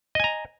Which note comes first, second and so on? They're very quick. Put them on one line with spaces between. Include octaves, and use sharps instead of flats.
D#5 G#5 A#5